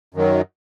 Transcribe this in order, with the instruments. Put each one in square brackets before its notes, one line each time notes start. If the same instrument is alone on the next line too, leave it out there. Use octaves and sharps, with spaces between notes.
[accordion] F#2 D#3 F#3